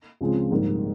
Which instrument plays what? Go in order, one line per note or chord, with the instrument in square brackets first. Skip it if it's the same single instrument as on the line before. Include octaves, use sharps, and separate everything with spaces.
[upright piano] C#2 C#3 F3 G#3 C4
A#1 G#2 G3 A#3